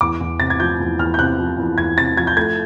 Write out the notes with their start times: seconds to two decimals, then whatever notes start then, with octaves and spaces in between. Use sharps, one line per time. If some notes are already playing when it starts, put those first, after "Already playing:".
0.01 E2 D6
0.20 E2
0.40 C3 A6
0.50 G#6
0.60 F3 G6
0.80 E2
0.99 E2 F6
1.14 G6
1.19 C3 F#6
1.39 F3
1.58 E2
1.78 E2 G#6
1.98 C3 A6
2.17 F3 G#6
2.27 G6
2.37 A3 G#6